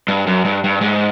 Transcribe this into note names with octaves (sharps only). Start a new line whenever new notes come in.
G2
F#2
G2
G2
G#2